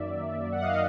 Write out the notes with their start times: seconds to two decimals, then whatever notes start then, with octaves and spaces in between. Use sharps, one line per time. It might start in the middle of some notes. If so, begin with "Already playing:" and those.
Already playing: F#2 D#3 F#3 A#3 D5 E5
0.52 F#5
0.62 D#5 F5